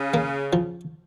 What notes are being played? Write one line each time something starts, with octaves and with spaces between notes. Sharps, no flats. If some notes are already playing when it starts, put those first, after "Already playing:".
Already playing: C#3
A#3
F3